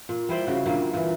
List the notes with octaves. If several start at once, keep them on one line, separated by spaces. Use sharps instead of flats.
A#2
G3 E4 C5 D5
C#3 F#4
A#2 D3 G3 A#3
A#2 E3